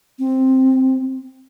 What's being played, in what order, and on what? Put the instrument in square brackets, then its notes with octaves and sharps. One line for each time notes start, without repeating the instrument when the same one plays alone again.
[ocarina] C4